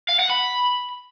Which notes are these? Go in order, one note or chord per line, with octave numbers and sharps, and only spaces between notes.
F5
F#5
B5